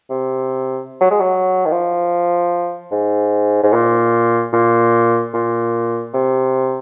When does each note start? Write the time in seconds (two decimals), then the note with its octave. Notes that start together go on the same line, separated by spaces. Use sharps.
0.10 C3
1.01 F#3
1.11 G#3
1.20 F#3
1.66 D#3
1.72 F3
2.92 G#2
3.63 G#2
3.73 A#2
4.53 A#2
5.34 A#2
6.14 C3